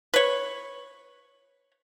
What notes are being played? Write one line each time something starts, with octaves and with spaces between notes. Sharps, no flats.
B4 C#5